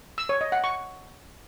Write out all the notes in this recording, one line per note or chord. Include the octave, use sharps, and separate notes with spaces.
E6
C#5
D#5
F#5
C#6